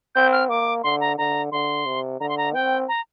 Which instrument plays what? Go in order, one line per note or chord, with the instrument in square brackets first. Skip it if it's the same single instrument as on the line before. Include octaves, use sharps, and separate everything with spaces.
[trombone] C4 [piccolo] G6
[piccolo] F6
[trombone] A#3 [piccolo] D6
[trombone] D3 [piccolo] C6
[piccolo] A#5
[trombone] D3 [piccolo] A#5
[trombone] D3 [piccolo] C6
[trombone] C3
[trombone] D3 [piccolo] A#5
[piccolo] C6
A#5
[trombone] C4 [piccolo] G5
[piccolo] A#5